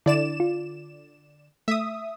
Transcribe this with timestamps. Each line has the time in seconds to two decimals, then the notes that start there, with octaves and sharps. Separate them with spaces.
0.06 D3 E4 D5 E7
0.40 F4
1.68 A3 E5 D#6